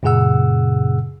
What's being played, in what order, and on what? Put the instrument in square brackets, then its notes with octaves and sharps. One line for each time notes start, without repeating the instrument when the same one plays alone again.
[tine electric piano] F#2 A#2 C#3 G#4 F#5 E6